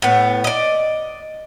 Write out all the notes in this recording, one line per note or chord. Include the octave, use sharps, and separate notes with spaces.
A2 B3
D5 D#5